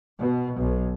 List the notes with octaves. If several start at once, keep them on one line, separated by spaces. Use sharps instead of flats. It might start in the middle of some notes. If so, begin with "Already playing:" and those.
B2
B1